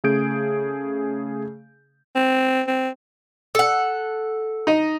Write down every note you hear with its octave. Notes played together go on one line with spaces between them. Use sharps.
C#3 A3 G#4 G6 D7
C4
C4
A4 F#5
D#4 D#5